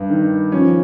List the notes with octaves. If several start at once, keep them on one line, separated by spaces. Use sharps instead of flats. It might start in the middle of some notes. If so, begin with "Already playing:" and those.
Already playing: G2
D#3
F3 C#4